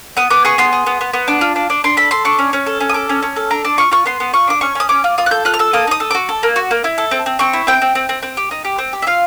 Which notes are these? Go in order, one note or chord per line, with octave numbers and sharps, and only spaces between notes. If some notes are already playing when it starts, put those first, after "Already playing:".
B3 D#6
B3 D6
G#4 C#6
B3 C6
G#4
B3
B3
B3
D4
F4
D4
D4
D4 C6
A4 B5
A4 C6
D4 C#6
C#4
C#4
A4
C#4
D#6
A4 D6
C#4
C#4
A4
D4 A#5
D4 A5
F4 C#6
F4 C#6
B3 C6
B3
F4 C#6
D4 D6
C#4 C#6
C#4 D#6
C#4 D6
F4
F4 D#6
F#6
A4 G6
F4 F#6
F6
A4 E6
A#3 D#6
D#4 D#6
A4
F#4 D6
A4
A#3
F#4
A#3
E4
A4
C4
C4
C4 C#6
E4
C4 G5
C4
C4
C4
C4
G4
D#4
G4
C4
G4
E5
F4 F5